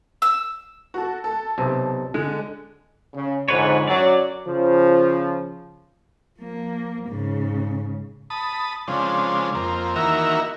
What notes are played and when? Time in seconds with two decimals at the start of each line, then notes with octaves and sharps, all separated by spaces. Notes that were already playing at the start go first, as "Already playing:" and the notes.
0.22 E6
0.94 F#4 A4
1.24 A4
1.58 B1 C3
2.14 D3 G#3
3.14 C#3
3.48 F2 G#2 D3 B4 C#5
3.87 F#2 F#3 D5
4.47 C#3 F3
6.39 F3 A#3
7.07 G#2 C#3
8.30 A5 B5 D#6
8.88 C#3 F3 G#3 C4 D4
9.55 F2 A#3 C4
9.96 D#3 E3 A#3 F#4 A#4 E5